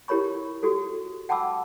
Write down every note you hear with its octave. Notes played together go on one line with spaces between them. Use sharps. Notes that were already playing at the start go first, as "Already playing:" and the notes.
E4 G4 A#4 C#5 B5 C#6
F#4 G4 A4
F#5 G5 A5 B5 D6 E6